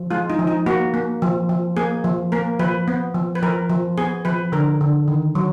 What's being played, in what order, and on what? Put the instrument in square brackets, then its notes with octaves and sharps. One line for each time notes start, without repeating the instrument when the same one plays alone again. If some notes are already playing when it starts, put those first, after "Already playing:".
Already playing: [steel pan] F3
G#3 F4
D#4
F3
D#4
A#3 F#4
A#3
F3
F3
A#3 G#4
F3
A#3 A#4
F3 B4
B3
F3
B4
F3 A#4
F3
B3 G#4
F3 B4
D3 A#4
D3
D#3
F#3